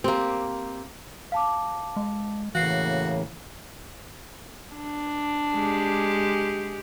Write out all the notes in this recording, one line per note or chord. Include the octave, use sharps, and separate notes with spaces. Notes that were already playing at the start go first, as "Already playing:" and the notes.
A#3 C4 G4
F5 A5 D6
G#3
A2 C#3 E3 A#3 F#4 F5 C7
D4
G#3 G4